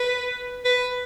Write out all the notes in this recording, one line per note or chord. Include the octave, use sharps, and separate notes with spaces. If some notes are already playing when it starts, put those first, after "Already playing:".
Already playing: B4
B4